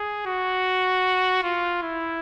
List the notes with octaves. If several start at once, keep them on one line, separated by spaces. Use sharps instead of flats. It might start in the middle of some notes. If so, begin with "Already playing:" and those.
Already playing: G#4
F#4
F4
E4